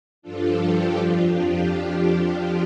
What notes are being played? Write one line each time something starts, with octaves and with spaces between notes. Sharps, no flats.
G2 F3 D4 F4 A4
G4
F2 F3 D4 F4
G4